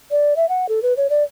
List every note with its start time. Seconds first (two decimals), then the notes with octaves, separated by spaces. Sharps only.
0.11 D5
0.36 E5
0.49 F#5
0.69 A4
0.82 B4
0.97 C#5
1.10 D5